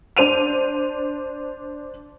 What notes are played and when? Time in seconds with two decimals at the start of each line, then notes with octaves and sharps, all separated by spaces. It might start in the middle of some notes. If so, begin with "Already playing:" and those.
0.17 D4 C5 D#7 F7